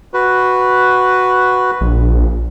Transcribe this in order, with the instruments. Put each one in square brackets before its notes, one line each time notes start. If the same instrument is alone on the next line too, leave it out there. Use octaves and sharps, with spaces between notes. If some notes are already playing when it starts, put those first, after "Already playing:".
[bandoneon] F#4 B4
[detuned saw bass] A#1